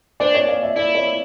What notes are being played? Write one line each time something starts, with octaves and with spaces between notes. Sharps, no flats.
D4 C5 D5
C#5 D#5
D#5 F5
D5 E5
E4 D5 E5
C#5 D#5